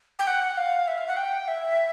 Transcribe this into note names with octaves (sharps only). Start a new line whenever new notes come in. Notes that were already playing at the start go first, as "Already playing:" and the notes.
G5
F#5
F5
E5
F5
F#5
G5
E5